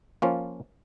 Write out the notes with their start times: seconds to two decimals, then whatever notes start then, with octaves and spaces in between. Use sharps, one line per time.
0.22 F3 A#3 C#4 F4